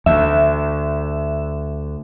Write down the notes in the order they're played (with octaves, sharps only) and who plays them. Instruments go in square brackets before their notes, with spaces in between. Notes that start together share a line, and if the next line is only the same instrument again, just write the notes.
[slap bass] D2 [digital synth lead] E5